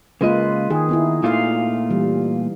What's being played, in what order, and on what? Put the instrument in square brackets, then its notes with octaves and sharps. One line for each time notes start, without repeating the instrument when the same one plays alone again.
[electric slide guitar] C#3 G#3 D#5 [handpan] A#3 F4 B4
[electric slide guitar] D#3 [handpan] G#4
[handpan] B3 D#4 E4
[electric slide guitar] A#2 A3 F4 [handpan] E4 F5
[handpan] E3 G3